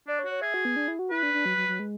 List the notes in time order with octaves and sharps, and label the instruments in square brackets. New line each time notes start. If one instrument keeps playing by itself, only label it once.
[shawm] D4 [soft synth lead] D5
[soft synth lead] C#5
[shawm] F#4
[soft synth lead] C#5
[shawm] G#4 [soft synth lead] E5
[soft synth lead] F#4
B3
D4
E4
F#4
[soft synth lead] E4 [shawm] B4
[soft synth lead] D4
D4
F#3
F#3
F#3
G#3